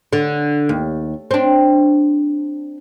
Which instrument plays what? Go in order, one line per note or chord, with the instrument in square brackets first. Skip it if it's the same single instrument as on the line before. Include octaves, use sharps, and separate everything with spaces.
[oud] D3
D#2
C4 D4